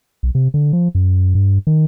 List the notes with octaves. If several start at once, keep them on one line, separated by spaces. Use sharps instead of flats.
B1
C3
D3
F3
F#2
G2
D#3